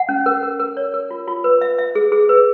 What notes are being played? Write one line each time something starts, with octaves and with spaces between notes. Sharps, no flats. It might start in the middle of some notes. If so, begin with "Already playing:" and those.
Already playing: F#5
C#4
A#4
A#4
A#4
C#5
A#4
F4
F4
B4
E5
E5
G#4
G#4
B4